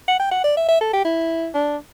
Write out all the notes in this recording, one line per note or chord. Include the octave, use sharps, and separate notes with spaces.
F#5
G5
F#5
D5
E5
E5
A4
G4
E4
D4